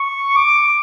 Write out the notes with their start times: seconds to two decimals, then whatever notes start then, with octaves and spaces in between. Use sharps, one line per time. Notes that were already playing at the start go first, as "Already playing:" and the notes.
Already playing: C#6
0.36 D6